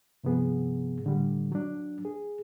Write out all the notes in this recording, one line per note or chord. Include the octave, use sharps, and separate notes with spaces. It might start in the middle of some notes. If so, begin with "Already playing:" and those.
G2 C3 F3 B3 G#4
A2 D3 G3
F#3 D4
G#4